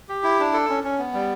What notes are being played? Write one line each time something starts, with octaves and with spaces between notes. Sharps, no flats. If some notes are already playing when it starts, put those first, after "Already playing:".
G4
E4
D4
A4
C#4
C#4
B3
G3